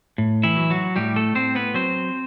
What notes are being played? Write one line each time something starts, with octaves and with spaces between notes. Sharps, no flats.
A2
E3 E4
F#3
F#3 F#4
A2 G3 G4
A3 A4
A2 C4 C5
B3 B4
F#3 C4 C5